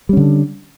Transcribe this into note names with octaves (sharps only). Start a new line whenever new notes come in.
D3 G3 C#4